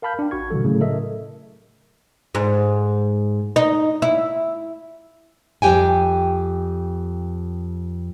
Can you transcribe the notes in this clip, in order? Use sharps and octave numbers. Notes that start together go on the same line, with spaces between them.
A#4 F5 A5 B5 F6 G6
D4 G5
A1 F#4 C#6 G#6
B2 D3 E3 G3 A4
A2 C#3 F#3 A3
A4 A#4 D#5 E5
G#2
D#4
E4
F2 A#2 G4 G5 G#5